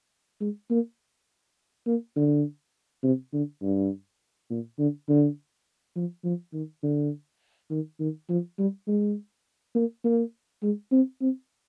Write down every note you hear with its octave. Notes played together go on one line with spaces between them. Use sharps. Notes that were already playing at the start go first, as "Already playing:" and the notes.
G#3
A#3
A#3
D3
C3
D3
G2
A#2
D3
D3
F3
F3
D#3
D3
D#3
D#3
F3
G3
G#3
A#3
A#3
G#3
C4
C4